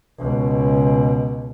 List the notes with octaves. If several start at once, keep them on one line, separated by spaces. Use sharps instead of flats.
C#2 B2